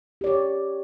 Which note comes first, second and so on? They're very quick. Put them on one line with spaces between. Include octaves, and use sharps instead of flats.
G4 D5 C#5